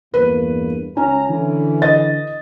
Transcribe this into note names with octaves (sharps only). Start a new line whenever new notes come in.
E2 G2 A#3 B4
C#2 C#4 A#5
D3 E3
D#5 A6